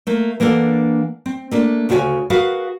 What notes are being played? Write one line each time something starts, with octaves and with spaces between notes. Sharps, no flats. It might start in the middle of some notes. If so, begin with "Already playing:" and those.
A3 A#3
E3 A#3 D4 A4 F#5
C4
A3 A#3 D4
D2 C#3 F#4 G#4 C#5 G#5
F#4 G#4 A#4 B4 F5 F#5